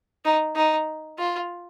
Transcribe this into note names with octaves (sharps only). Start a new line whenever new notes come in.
D#4
D#4
F4